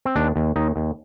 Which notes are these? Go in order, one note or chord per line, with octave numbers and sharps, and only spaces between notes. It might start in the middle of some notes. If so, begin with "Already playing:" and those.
C4
D#2 D4
D#2
D#2 D#4
D#2